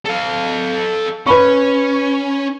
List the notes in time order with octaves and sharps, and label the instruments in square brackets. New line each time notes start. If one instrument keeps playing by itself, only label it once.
[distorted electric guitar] A4 F5
[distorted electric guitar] C#4 [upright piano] B4 B5 C#6